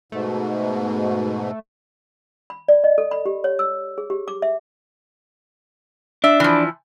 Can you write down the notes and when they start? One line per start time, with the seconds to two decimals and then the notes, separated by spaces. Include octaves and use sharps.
0.12 G#2 B2 A3
2.50 B5
2.68 D5
2.84 D#5
2.98 A4
3.11 B5
3.26 G4
3.44 C#5
3.59 E6
3.98 G#4
4.10 G4
4.28 D6
4.42 E5
6.24 D4 E5
6.40 E3 F3